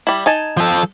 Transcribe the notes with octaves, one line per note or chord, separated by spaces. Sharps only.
G3 E4
D#4 G#5 A5
F3 A4